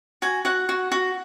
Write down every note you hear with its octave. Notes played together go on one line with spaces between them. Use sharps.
F#4 G#5
F#4 F#5
F#4
F#4